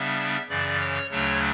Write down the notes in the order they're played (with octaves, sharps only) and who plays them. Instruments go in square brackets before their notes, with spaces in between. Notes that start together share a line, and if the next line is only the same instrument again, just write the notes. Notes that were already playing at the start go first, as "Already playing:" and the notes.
Already playing: [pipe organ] C#3 G3 B3 D4 E5
F#2 C#3 E3 D5
C#5
D2 C#3 F#3 A3 D4 C#5